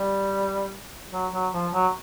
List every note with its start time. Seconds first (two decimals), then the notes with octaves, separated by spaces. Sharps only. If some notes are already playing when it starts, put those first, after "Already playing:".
Already playing: G3
1.12 F#3
1.33 F#3
1.53 F3
1.73 F#3